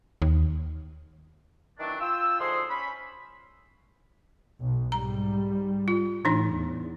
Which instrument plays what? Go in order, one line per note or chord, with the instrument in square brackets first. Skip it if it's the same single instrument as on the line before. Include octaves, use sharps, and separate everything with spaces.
[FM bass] D#2
[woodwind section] D#3 E3 F#3 A3 D4
F4 G5 E6
D2 F3 D4 D#4 G#4 C6
C#4 B5
[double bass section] B1
[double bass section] G#2 G3 [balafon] A#5
[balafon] F4
[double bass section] A2 [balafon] E3 D4 D#4
[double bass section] E2